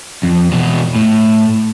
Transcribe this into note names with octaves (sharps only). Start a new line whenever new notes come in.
F2
E2 B2
A2